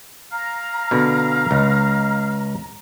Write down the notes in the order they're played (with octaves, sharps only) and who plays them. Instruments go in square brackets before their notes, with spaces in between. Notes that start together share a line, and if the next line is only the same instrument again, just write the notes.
[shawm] F5 [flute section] A#5
[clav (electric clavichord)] B2 D3
C#2